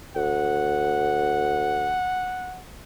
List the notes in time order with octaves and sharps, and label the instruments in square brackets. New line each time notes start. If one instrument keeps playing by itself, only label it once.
[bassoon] D2 [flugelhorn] F#5